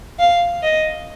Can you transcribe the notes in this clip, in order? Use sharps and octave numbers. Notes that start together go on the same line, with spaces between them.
F5
D#5